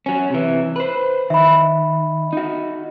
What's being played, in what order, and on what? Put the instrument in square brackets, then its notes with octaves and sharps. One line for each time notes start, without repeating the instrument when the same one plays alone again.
[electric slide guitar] F#3 C#4
C3 E3
B4 C5
[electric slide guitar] D#3 [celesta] E5 B5
[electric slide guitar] D#4 F#4